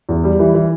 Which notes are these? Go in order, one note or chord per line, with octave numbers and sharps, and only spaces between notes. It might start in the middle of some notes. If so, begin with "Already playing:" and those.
E2
G3
E3
E3